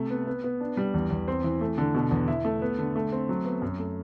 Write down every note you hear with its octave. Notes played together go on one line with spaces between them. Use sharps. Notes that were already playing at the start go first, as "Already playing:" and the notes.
Already playing: C3 A3
B3
B3
B3
D4
G3
E2
E2
C4
E3
A3
D3
B2
E2
E4
A3
B3
D3
A3
C4
F#3
B3
F#2
A3